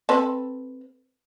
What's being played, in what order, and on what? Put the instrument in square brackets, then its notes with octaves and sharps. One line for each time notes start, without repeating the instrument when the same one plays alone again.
[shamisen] C4 A4 B4